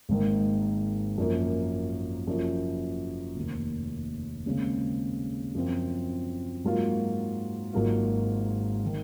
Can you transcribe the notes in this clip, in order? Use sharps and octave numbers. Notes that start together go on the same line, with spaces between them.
G#1 G#2 D#3 A#3
F#2 F3 A#3
F#1 F#2 F3
F1 D#2 D#3
D#2 C#3 G#3 C4
F#2 F3 C4 F4
G#2 F#3 A#3 F4
G#1 G#2 F#3 A#3 F4
D#3